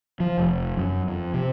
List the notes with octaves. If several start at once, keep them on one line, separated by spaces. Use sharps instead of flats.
F3
F1
F#2
F2
C3